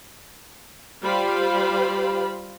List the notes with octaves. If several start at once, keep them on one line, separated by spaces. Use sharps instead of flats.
G3 F4 G4 C5 F5 B5